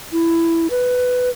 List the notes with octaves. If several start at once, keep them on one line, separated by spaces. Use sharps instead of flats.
E4
B4